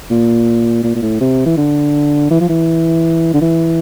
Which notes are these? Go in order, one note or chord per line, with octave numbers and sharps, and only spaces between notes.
A#2
A#2
A#2
A2
C3
E3
D3
E3
F3
E3
D3
E3